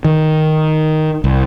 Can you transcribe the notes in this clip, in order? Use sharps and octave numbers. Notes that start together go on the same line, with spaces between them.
D#3
C2